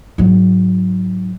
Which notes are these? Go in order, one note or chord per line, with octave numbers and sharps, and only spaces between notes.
G#2 F#3